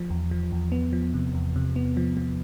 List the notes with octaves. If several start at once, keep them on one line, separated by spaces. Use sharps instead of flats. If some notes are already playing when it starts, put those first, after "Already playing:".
Already playing: F3
E2
F3
E2
B3
F3
C3
E2
C3
B3
F3
F3